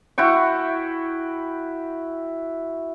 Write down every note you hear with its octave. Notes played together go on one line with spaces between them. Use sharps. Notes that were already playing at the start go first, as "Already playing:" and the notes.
E4 F#4 G5 C#6